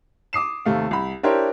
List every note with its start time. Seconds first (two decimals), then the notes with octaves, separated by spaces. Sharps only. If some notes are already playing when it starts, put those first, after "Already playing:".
0.33 D6 D#6 C7 E7
0.65 D#2 C3 A3 F5
0.91 C2 B5
1.23 D4 E4 G4 A#4 C5 C#5